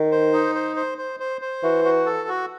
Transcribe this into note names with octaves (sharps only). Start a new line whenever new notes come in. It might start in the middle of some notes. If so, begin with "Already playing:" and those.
Already playing: D#3
C5
D#4
C5
C5
C5
C5
C5
E3 F#4
F#4
A4
F#4